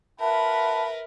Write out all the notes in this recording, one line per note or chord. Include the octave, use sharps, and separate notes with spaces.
F4 A#4 B4 E5 F#5 A5 B5